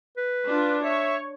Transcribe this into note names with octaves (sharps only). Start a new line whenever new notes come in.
B4
D4 F4
C#5 E5